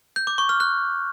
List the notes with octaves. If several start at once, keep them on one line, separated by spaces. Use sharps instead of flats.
G6
D6
C#6
F6
F#6